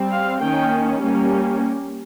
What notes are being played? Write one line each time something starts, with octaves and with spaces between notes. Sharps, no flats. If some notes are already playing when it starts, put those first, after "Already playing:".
Already playing: G3 C4
F5
D#3 A#3 C#4 G5
G3 A#3 C#4